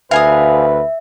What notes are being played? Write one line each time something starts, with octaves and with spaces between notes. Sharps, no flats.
D2 B4 E5 F5 G#5 D#6